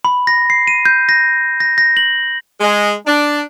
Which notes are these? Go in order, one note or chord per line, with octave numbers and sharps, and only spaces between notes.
B5
A#6
C7
D#7
G6
A#6
A#6
A#6
F#7
G#3
D4